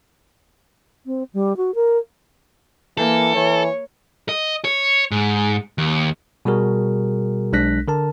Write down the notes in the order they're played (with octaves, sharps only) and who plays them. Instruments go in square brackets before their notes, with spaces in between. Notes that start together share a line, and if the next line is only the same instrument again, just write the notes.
[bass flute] C4
G3
F#4
A#4
[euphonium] E3 [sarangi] A#3 [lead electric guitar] A4
[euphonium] E3 [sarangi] C#5
[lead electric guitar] D#5
C#5
G#2
D#2
[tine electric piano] B2 G3 F#4 G#4 A#4
B1 G#3 D4 F#6 A#6 B6
D3 A#4 A5